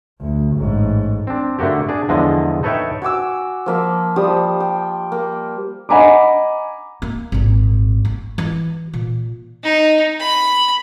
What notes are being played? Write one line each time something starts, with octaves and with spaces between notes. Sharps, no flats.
D2
A1 G#2
C4 D4
D3 A3 A#3 F#4 G4
D4 G#4
E2 D3 F3 G#3 D#5
D#4 A4 B4 C#5 E5 G5
F#4 G#5 D6 E6
F3 A#3 E5
F3 G3 G4 D#6
G5
A#3
D#5 F#5 G#5 A#5 B5 D6
A#3
G#1 A#2
A3
E3
A#2
D#4
B5